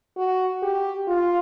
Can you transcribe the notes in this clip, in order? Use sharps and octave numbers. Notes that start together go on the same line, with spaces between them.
F#4
G4
F4